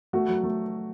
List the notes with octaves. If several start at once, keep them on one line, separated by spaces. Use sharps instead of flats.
A3 F#4
F#3
A3